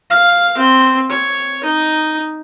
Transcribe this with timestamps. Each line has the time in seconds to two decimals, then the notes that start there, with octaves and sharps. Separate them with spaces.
0.10 F5
0.58 C4
1.10 C#5
1.64 D#4